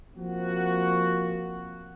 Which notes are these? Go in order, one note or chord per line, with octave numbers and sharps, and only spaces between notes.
F3 A#3 C4 F#4